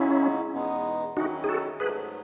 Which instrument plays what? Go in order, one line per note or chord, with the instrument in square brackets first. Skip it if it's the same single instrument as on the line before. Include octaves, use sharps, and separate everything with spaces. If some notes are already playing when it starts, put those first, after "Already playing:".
Already playing: [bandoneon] C#3 G#3 D#4 F#4 [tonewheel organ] C#4 E4
[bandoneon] E2 B2 G#3 B3 D#4
[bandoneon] D#3 F#3 C#4 E4 [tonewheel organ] D#4 F#4
[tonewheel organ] G#4
F#4 A4
[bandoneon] G#2 F#3 A3 [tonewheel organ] G#4 B4